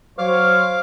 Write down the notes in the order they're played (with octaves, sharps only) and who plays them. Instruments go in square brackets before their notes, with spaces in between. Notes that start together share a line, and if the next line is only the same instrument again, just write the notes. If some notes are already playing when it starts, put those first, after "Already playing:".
[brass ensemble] F#3 C5 C#5 [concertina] F5 D6 F6